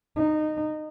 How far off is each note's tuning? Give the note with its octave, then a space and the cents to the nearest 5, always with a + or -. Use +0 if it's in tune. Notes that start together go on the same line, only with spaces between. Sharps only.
D#4 -15